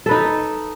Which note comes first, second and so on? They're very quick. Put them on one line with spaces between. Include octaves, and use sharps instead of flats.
A4 B4 D#4